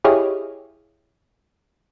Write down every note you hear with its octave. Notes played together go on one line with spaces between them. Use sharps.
E4 G4 G#4 C#5 D#5 F5